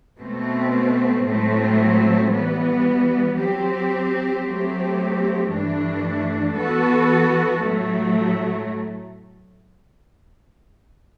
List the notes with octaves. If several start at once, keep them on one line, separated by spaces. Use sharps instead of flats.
B2 A3 C4
A2 F#3 A3 C4
E3 G3 B3
F#3 C4 G4
F#3 A3 C4 G4
G2 E3 A3 D4
E3 B3 F#4 A4
A2 F#3 A3